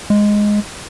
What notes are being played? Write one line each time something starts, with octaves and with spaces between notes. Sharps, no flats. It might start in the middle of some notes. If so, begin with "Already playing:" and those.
G#3